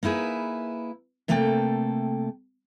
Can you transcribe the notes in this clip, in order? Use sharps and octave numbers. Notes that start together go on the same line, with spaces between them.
A#3 D#4 E4 G#4 B4
C3 A3 A#3 A4 C#5 G5